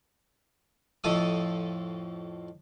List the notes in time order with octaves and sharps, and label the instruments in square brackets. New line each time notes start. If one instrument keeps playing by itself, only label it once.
[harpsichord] F2 A2 A4 D#6